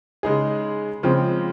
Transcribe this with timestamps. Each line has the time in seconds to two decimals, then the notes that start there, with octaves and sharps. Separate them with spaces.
0.23 C#3 G#3 D#4 G#4
1.03 C#3 F3 G#3 C4